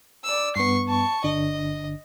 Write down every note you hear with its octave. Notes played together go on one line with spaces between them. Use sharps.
D5 E6
G2 B3 C#6 C7
A5 C#6
G1 D3 D4 D#5